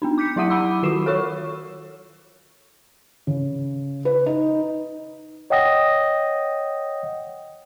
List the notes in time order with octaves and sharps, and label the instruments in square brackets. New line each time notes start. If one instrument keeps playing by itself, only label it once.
[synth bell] B3 D4 D#4
D6 G6 B6 C#7
F#3 E4 E5 F#5 D#6 D#7
F#5 B5 D6 E6
D#3 F4 F#4 C7 E7
A4 A#4 C#5 C#6 E6
[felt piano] C#3
B4
D#4
[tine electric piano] C#5 D#5 F#5 G5 D#6 A#6